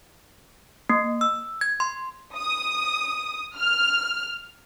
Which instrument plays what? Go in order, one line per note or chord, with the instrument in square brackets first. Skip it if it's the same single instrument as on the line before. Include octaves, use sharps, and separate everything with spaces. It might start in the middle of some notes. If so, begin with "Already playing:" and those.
[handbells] A#3
E6
G#6
C6
[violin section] D#6
F6